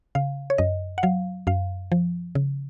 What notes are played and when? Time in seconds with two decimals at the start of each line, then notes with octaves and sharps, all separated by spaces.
0.15 C#3 F5
0.50 C#5
0.58 F#2 D#5
0.98 F#5
1.03 F#3 F5
1.47 F#2 F5
1.92 F3
2.35 C#3